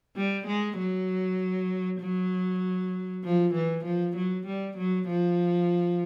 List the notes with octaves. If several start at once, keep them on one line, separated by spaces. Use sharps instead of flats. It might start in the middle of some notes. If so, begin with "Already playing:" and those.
G3
G#3
F#3
F#3
F3
E3
F3
F#3
G3
F#3
F3